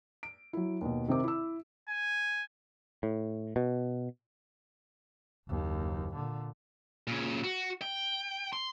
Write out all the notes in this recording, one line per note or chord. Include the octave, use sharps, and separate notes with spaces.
D7
F#3 E4
D#2 B2
C3 D#3 C4 A#4 D6
E4 E6
G#5
A2
B2
F#1 D#2
A#2 D3
A#2 C#3
F#4
G5
C6